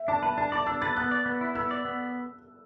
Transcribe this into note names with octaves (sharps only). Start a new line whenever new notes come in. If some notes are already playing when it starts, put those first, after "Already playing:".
Already playing: E5
D4 A5
B4 A5
D4 A5
D5 D6
D4 E6
B4 A6
B3 F#6
D5
B3
E4
B3 E6
D5
B3